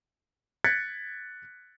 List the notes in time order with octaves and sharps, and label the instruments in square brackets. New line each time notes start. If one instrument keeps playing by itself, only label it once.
[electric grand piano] F#6 G#6 A6 B6 C#7